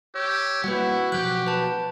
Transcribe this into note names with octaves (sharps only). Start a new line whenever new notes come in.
G4 C#5 E6
G3 A#3 E4 F#4 B4 F#5
B2 F3 F#3 G4 F#6
B4 A5